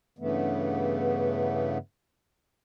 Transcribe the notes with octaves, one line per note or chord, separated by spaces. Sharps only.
G2 C#3 E3 A3 B3